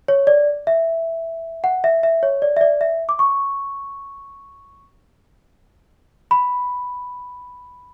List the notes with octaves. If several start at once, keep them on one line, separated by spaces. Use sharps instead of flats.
C#5
D5
E5
F#5
E5
E5
C#5
D5
E5
D5
E5
D6
C#6
B5